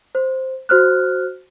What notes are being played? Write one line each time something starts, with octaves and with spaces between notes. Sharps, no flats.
C5
F#4 C5 F6 F#6